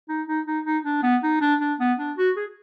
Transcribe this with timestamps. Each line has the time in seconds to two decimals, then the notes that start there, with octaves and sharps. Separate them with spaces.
0.09 D#4
0.27 D#4
0.47 D#4
0.65 D#4
0.85 D4
1.03 B3
1.23 D#4
1.41 D4
1.60 D4
1.80 B3
1.99 D4
2.17 F#4
2.37 G#4